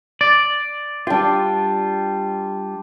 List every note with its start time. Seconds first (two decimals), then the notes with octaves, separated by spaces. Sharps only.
0.21 D5
1.07 G3 D4 F4 G5